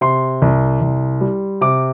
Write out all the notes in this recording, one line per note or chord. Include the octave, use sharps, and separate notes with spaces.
C3 C6
C2
C2
G3
C3 D6